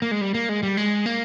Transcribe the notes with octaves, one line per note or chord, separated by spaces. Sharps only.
A#3
G#3
G3
A#3
G#3
G3
G#3
A#3